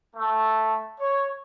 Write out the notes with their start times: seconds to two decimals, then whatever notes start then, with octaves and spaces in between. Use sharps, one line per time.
0.16 A3
1.00 C#5